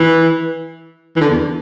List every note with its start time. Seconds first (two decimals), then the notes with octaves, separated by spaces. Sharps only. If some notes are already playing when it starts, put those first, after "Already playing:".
Already playing: E3
1.16 E3
1.21 D3
1.30 E2